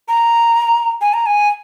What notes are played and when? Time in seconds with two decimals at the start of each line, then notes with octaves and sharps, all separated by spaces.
0.08 A#5
1.01 G#5
1.14 A#5
1.26 G#5